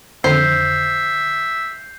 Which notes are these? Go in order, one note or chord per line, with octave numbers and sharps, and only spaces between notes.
F2 D3 D#3 C5 E5 G6 C7